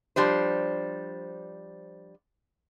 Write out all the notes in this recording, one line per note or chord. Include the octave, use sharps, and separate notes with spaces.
F3 G3 D4 C5